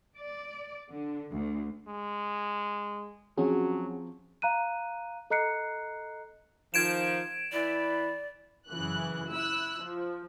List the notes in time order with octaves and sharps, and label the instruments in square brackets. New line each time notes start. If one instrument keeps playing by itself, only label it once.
[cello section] D5
D3
D2
[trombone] G#3
[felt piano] F3 C4 [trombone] F#3 [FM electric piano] C#4 F#4 G#4
[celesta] F5 A#5 F#6 D#7
A4 D#5 A#5 F#6 C7 C#7
[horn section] D#3 F3 [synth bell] G#6 D7 E7
[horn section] E3 E4 B5 [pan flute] D5
[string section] F#2 C#3 E3 F#6
E4 E6 F#6
F3